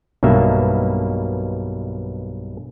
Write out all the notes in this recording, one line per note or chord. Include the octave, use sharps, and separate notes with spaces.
B1 G2 B2 A#3 E5